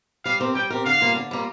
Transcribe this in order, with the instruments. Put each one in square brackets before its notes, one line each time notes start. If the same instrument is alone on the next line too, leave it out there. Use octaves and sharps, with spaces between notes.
[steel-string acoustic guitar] G3 [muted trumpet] F5
[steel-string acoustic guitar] C4 G4 A#4
[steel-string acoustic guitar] G3 [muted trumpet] G5
[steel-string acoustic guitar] C4 G4 A#4
[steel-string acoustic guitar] D3 [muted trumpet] F5
[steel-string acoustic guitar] G3 A#3 F4
D3
G3 A#3 F4